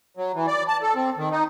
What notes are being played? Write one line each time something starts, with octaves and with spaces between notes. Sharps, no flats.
F#3
E3
D5
A5
A4
C4
D#3
D#4